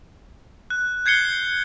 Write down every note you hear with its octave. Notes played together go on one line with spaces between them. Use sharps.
F#6
G6 G#6 C7 C#7 G7